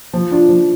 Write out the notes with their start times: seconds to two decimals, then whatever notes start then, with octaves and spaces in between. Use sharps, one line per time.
0.13 F3
0.31 D4 F4
0.49 F3